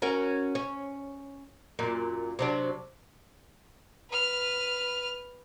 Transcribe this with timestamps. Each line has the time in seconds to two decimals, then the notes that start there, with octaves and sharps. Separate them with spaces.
0.02 C#4 F#4 A#4
0.55 C#4
1.79 F#2 A#2
2.39 C3 F#3 D4
4.10 B4 F6